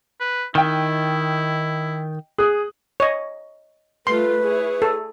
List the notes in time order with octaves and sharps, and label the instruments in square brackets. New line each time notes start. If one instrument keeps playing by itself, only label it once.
[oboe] B4
[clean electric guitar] D#3 [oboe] E4 [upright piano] D#5 G5
[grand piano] G#4 [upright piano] D#6 F#6
[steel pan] C#5 D#5
[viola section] G3 A3 F4 [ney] B4 [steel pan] C6
[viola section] E4 G#4 C#5
[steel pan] A4